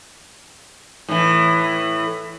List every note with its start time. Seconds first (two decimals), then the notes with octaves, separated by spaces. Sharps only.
1.09 A2 E3